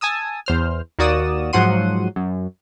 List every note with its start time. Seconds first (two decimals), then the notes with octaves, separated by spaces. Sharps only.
0.01 G#5 A5 D#6 E6
0.46 E2 C5 F6
0.99 D#2 A#3 F#4 D5 D#6 E7
1.53 G#2 F3 F#3 F#5 C6 D#7
2.16 F#2